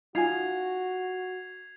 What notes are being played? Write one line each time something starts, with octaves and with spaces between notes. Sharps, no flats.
D#4 F4 F#4 G#5 G#6 C7 F7